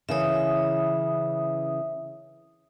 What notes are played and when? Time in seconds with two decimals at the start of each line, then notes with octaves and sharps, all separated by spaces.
0.09 C#3 E3 C#4 E5 D#6